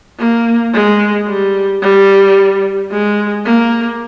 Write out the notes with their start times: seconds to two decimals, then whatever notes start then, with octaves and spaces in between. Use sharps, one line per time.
0.19 A#3
0.73 G#3
1.28 G3
1.82 G3
2.91 G#3
3.45 A#3